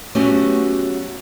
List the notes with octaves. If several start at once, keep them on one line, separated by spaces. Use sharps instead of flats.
F#3 A3 B3 C#4 F#4 G4